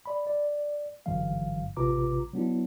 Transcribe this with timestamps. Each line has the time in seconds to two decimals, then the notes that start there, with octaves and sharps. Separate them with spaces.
0.06 D5 B5
0.27 D5
1.06 G1 G2 D3 E3 F#3 F5
1.77 A1 C3 F4 B4 A#5 D6
2.33 F#3 B3 D4 E4